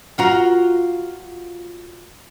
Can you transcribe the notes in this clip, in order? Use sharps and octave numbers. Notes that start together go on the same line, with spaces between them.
F4 F#4 A#4